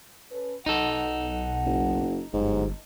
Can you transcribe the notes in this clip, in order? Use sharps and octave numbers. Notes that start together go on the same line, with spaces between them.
C#4 A4 B4
B1 D#4 A4 F#5
F#1
G1 G#2 F#3 G4